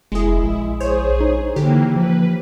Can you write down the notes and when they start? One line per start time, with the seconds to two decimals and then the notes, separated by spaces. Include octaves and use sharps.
0.12 F1 G#3 E4 G#4
0.43 A#1
0.80 G#4 C5 C#5
1.20 D#4
1.56 D3 E3 A#3 G4
1.96 F3 B4